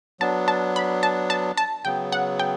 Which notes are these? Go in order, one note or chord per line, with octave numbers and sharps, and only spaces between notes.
F#3 B3 D4 A5
A5
B5
A5
A5
A5
C#3 F#3 B3 G5
F#5
G5